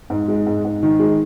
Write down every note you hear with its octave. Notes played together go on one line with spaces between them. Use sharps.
G#2
G#3
G#2
G#2
D#3
G#3